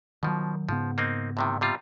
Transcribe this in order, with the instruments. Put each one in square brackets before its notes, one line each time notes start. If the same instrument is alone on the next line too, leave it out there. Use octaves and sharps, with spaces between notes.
[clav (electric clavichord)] B2 F3 [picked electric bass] D#3 F#3
[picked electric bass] G#2 C#3 B3 [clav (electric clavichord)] F3
[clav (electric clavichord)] A#3 C4 D#4
A2 C3 D#3
C3 G3 F4